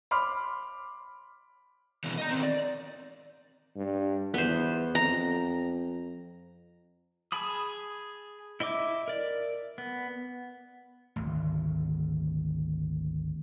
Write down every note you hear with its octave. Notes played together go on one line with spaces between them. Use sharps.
B5 C6 D6 F6
B2 E3
D#5 A#5
D#3 C4
D5
G2
E2 B3 C5
F2 A#5
G#4 G#5 A5 B5 D#6
E4 D#5 E5 D6
A#4 D5
B3
G#1 D2